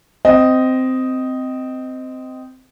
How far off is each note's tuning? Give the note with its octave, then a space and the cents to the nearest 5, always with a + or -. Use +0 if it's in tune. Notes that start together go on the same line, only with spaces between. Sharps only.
C4 -15 D#5 +0